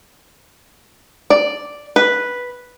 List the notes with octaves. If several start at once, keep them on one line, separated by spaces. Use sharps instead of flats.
D5
B4